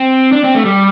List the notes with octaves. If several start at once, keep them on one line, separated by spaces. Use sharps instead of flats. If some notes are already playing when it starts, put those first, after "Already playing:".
Already playing: C4
D4
C4
A3
G3